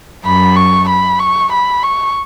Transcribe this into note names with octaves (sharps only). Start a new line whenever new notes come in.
F#2 B5
C#6
B5
C#6
B5
C#6